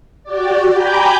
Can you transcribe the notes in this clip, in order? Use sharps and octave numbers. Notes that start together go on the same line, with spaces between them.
F#4 G4 D5
G5 G#5 A#5 B5 D6 G6